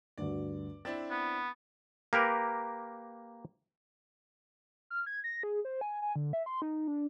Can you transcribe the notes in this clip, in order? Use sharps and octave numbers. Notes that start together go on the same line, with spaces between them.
D2 G2 F#4 D5
C4 D4 E4 A6
B3
A#3 G4 A#4 B4
F6
G#6
A#6
G#4
C5
G#5
G#5
D3
E5
C6
D#4
D4